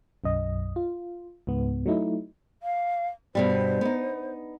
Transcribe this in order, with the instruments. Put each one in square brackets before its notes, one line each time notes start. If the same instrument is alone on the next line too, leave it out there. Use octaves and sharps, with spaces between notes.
[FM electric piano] B1 F#2 D#5
F4
C#2 G#2 B3
F#3 A3 D#4 E4
[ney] F5
[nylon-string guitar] G2 B2 G3 [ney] C5
[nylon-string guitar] B3 D#4